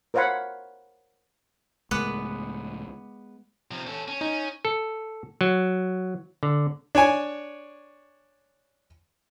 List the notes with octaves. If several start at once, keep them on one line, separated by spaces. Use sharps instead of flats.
A#4 C5 C#5 F5 F#5 B5
C#2 A2 G#3 B3 D6 F#6
C3 F3
C#4 A4
C#4
C#4 D#4
A4
F#3
D3
D4 C#5 G#5